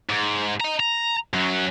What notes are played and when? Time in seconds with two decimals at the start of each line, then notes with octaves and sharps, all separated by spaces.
0.10 G#2
0.60 D#5 A#5
0.80 A#5
1.34 F#2 F#3